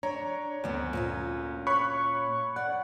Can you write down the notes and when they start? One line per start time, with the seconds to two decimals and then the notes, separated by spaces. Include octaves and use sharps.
0.03 D4 C#5 A#5
0.64 D2 B3 C4
0.93 A#2 C#4 F4
1.67 C#5 B5 C#6 F#6
2.56 D5 F#5